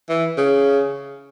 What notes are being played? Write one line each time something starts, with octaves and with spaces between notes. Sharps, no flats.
E3
C#3